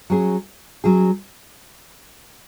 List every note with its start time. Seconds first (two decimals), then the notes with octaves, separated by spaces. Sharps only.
0.10 F#3 C#4 G#4
0.84 F#3 C#4 G#4